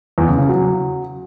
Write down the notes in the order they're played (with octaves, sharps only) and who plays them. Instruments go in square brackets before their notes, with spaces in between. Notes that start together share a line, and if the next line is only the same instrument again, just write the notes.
[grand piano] E2
C#3
C#3
F#3